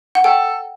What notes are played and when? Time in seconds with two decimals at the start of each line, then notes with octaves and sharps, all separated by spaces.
0.15 F#5
0.24 A4 G5